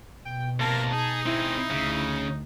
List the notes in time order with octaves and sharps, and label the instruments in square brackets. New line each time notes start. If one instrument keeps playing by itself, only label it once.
[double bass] B2 [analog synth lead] G5
[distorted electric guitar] C3 A#3 [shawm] A#4 [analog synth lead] A5
[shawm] D#4 [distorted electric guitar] G#4
[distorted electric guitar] C4 G#4 [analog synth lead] E4
[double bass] D2 [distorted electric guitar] C#3